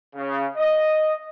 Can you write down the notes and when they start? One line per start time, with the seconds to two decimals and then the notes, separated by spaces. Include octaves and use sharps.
0.15 C#3
0.57 D#5